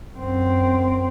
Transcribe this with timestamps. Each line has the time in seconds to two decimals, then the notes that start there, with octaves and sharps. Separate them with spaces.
0.15 F#2 C4